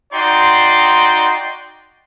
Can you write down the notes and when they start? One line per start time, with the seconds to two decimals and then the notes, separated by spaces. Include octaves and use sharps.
0.13 D#4 F#4 D5 G5 C6